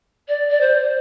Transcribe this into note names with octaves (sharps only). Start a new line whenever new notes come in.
D5
D5
C5